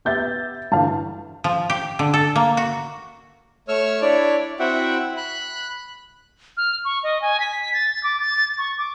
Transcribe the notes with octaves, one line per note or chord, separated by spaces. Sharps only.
B3 G4 E5 G6 A6
G2 D3 E3 F5 A5
F3
G4
D3
A4
A#3
F#4
A3 C#5 C#6 E6 F6
D4 E4 C#5 D5
C4 E4 F#4 E5 F#5 G5
B5 F#6
F6
C#6
D#5
G#5
B6
A6
D6
A6
C#6
D6